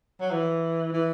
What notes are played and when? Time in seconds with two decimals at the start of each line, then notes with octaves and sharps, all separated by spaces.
0.20 F#3
0.31 E3
0.92 E3